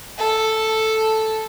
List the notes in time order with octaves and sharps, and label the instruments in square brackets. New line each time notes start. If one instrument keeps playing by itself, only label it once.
[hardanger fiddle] A4